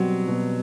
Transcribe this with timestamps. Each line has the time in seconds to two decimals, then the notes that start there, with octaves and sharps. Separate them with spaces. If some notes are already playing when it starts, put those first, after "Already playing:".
Already playing: B2 F#3 G3 C4
0.28 B2